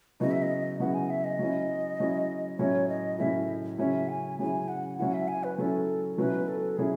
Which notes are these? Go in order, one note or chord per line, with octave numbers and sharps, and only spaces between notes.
C#3 F#3 B3 E4 D#5
E5
D#5
C#3 F#3 B3 E4 F#5
G#5
E5
D#5
F#3 C#4 E4
F#3 C#4 E4
A2 F#3 C#4 E4 C#5
D#5
A2 F#3 C#4 E4 E5
C#3 F#3 C#4 E4 E5
G#5
C#3 F#3 C#4 E4 G#5
F#5
F#3 C#4 E4 F#5
E5
G#5
B4
F#3 C#4 E4 A4
B2 F#3 C#4 E4 B4
A4
B2 F#3 C#4 E4 G#4